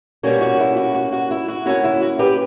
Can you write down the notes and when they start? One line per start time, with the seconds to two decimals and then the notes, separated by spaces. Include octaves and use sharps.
0.23 B2 G3 A#3 C#4 F#4
0.41 F#4
0.60 E4
0.77 F#4
0.95 F#4
1.12 F#4
1.31 E4
1.48 F#4
1.66 D3 A#3 C#4 E4 F#4
1.84 E4
2.02 F#4
2.19 G4 B4